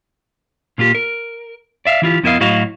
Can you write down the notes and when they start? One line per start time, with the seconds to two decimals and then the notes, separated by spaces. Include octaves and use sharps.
0.78 A#2 A#3 F4 G4
0.95 A#4
1.85 D5 E5 F5
2.02 E3 E4 F4 G4
2.23 F2 B3 E4 A#4 D#5 F5
2.40 A2 F#3 E4 F#4 D#5 F5